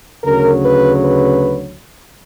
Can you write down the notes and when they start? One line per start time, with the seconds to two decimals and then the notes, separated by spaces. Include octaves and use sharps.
0.24 D2 C#3 F#3 A#4
0.63 B4
1.01 B4